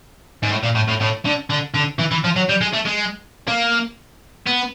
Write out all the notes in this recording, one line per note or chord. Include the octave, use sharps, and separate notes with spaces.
G#2
A2
A#2
A2
A2
A2
D3
D3
D3
E3
E3
F3
F#3
G3
G#3
A3
G#3
A#3
B3